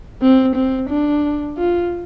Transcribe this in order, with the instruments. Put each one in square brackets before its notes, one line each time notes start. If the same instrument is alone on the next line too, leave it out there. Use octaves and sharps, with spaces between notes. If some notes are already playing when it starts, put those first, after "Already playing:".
[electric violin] C4
C4
D4
F4